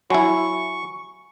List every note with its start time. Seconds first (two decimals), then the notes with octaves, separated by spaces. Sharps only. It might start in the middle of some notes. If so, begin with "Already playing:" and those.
0.10 F#3 E4 F#5 G#5 B5 C#6